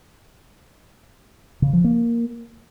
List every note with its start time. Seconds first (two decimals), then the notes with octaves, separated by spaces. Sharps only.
1.62 C#3
1.73 F3
1.84 A#3